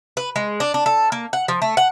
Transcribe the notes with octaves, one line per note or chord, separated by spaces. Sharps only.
B4
G#3
D4
D4
A4
A#3
F#5
F3
A3
F#5